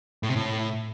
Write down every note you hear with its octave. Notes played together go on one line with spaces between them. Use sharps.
A2
C3
A2